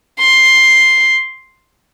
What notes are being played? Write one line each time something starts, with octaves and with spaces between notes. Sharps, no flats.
C6